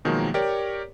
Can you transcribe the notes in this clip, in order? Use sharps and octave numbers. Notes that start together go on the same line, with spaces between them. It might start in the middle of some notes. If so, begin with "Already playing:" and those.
B2 D#3 F3 F#3 G#3 A#3
G4 A#4 C#5 D5